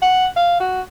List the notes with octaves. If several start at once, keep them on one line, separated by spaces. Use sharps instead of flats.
F#5
F5
F#4